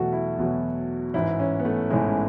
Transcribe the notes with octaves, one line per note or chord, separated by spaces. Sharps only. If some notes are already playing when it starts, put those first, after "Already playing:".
Already playing: E2 B2 F#3 A3 F#4
E4
E2 B2 F#3
A1 G#2 E3 E4
C#4
B3
A3
A1 G#2 E3 G#3